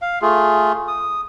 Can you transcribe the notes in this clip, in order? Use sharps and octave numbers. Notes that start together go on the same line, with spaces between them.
F5
A3 F4 G#4
D#6